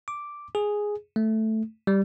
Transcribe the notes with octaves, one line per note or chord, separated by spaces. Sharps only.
D6
G#4
A3
G3